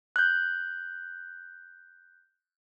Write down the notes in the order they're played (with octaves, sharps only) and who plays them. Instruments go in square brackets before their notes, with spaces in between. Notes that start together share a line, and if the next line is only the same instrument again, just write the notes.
[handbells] F#6 G6